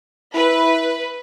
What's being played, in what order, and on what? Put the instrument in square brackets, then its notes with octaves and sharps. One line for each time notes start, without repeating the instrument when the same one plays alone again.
[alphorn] E4 [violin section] B4